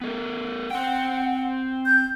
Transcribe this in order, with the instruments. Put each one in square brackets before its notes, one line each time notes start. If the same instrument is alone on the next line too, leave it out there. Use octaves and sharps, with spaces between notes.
[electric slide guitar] B3 A4 A#4
[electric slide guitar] C4 G5 [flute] F#5
[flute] G6